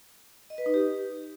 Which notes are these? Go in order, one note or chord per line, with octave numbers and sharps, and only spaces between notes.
D#5
B4
D#4
G4